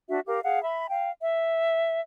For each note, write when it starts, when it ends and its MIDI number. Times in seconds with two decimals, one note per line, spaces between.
0.08 0.19 62
0.08 0.19 66
0.08 0.19 76
0.26 0.39 67
0.26 0.39 70
0.26 0.39 77
0.44 0.61 68
0.44 0.61 77
0.44 0.61 78
0.62 0.86 76
0.62 0.86 83
0.89 1.10 77
0.89 1.10 79
1.20 2.00 76